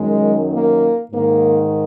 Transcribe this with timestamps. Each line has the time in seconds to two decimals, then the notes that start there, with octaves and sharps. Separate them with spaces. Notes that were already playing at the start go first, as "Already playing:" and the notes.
Already playing: F#2 D#3 G#3
0.52 A#3
1.12 G#2 D#3 A#3